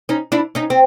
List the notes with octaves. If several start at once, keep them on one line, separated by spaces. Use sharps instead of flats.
C#4 D#4
D4 E4
C#4 D#4
C4